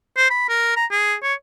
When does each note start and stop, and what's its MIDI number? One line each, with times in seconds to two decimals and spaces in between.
0.17 0.29 72
0.30 0.45 83
0.49 0.72 70
0.76 0.86 82
0.91 1.15 68
1.23 1.34 73